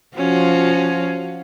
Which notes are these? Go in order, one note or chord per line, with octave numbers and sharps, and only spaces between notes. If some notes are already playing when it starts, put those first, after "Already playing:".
F3 C#4 F4 F#4